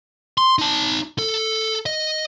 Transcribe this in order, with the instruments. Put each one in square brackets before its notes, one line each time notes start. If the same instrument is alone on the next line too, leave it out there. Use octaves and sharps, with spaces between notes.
[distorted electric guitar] C6
D#4 A5
A4
D#5